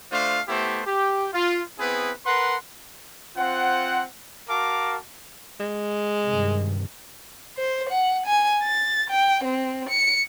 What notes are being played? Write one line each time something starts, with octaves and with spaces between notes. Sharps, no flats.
A3 D4 F4 C5 F5
A3 B3 E4 G4 C5
G4
F4
B3 C4 E4 G#4 B4
A#4 B4 F#5 C6
C4 F4 C5 F#5
F#4 A#4 F5 A5 D6
G#3
G2 C3 D#3
C5
F#5
G#5
A6
G5
C4
C#7